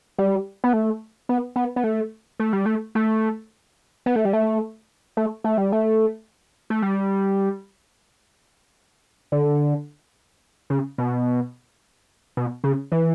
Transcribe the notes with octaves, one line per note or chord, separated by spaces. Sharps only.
G3
B3
A3
B3
B3
B3
A3
A3
G3
A3
A3
B3
A3
G3
A3
A3
A3
G3
A3
A3
G3
D3
C#3
B2
B2
C#3
E3